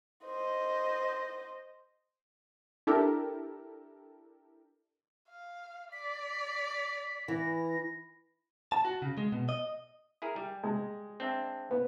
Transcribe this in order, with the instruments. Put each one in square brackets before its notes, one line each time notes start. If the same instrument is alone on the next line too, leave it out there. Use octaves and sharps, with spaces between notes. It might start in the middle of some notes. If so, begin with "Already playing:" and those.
[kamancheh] C5 D#5
[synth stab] D4 E4 G4 A4 A#4
[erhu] F5
[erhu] D5 [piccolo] B6
[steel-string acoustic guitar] E3 [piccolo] A#6
[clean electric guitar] A5
F#4
C#3
G#3
B2
D#5
[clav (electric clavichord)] E4 G#4 A#4
G3
[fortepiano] G#3
[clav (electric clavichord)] C4 D4 E5
[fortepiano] B3